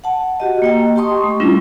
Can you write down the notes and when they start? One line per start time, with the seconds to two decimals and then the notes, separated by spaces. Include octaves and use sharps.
0.04 F#5 A5
0.40 F#4 G4 D#5
0.62 A#3 D#5 G5
0.96 G4 G5 A5 C6 C#6 D#6
1.24 A3
1.40 G3 C#4 D4 E4 F4